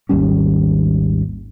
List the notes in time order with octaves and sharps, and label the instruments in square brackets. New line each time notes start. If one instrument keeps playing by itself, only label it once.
[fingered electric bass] G#1 D#2 G3 C#4